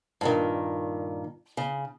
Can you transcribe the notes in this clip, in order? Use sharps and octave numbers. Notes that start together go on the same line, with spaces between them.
G2 A#2 D#3
C#3